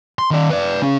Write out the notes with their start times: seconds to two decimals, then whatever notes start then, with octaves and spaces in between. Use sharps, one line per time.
0.19 C6
0.31 D#3 D5
0.50 B4 D5
0.82 C#3 C#4